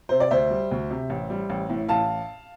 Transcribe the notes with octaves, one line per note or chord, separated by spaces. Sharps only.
C3 C5
D5
D2 C5 E5
G3
D2
C3
A1
G3
A1
A2
A1 F5 A5